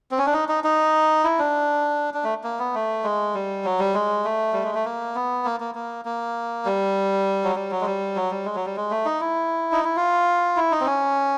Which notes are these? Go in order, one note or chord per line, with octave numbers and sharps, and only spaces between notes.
C4
C#4
D4
D#4
D#4
D#4
E4
D4
D4
A3
A#3
B3
A3
G#3
G3
F#3
G3
G#3
A3
G3
G#3
A3
A#3
B3
A#3
A#3
A#3
A#3
G3
F#3
G3
F#3
G#3
G3
F#3
G3
G#3
F#3
G3
G#3
A3
D#4
E4
D#4
E4
F4
E4
D#4
C4
C#4